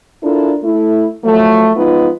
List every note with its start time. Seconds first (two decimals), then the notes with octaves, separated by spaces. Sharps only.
0.23 D4 E4 F4 A4 A#4
0.64 A3 E4
1.24 F3 F#3 A3
1.75 F3 G#3 B3 D#4 F4